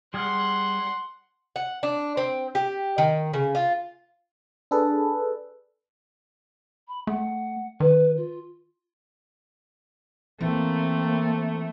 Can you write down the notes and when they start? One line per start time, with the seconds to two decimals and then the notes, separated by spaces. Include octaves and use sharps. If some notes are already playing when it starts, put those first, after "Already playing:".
0.14 G3 G#4 F#5 C6 F6
1.56 F#5
1.83 D4
2.17 C4
2.55 G4
2.98 D#3
3.33 C#3
3.55 F4
4.71 D4 G#4 A4 B4
6.88 B5
7.07 A3 F#5
7.80 D#3 B4
8.17 F4
10.41 E3 A3 A#3 C4